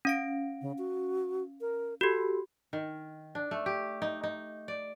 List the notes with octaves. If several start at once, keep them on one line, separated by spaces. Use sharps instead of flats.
C#4 F5 D7
C#3
F#4
A#4
F#4 G4 A4
D#3
D4
A3
G4
D#4
D#4
D5